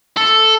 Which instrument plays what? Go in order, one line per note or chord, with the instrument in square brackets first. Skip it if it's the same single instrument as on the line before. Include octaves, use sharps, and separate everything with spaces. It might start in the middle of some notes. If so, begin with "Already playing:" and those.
[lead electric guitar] A4